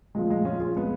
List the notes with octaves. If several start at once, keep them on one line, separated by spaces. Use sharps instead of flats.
A#2 F3 G#3
G#3
C#4 F4
F4 G#4
G#3 B3